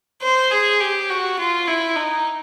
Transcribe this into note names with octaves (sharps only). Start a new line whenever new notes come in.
C5
G#4
G4
F#4
F4
E4
D#4